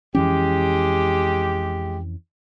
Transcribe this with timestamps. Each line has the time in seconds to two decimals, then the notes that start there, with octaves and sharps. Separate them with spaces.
0.15 F2 E3 G#3 C#4 G4